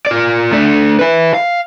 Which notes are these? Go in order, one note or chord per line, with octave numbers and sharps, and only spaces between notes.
F4 D5
A3 D4
E4 B4
F5